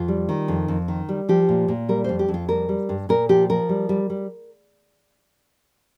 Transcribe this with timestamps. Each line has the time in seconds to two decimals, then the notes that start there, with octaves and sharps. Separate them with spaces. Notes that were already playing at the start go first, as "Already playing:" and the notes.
Already playing: F2 F4
0.08 G3
0.29 D#3
0.48 F2
0.68 F2
0.88 D#3
1.09 G3
1.29 F3 G4
1.49 A#2
1.68 A#2
1.89 G3 A#4
2.04 F2 C5
2.19 G4
2.28 F2
2.34 F4
2.49 G3 A#4
2.69 G3
2.89 G2
3.09 A#2 A#4
3.29 F3 G4
3.49 F3 A#4
3.69 G3
3.89 G3
4.10 G3